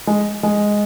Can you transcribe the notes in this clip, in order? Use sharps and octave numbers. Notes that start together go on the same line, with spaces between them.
G#3
G#3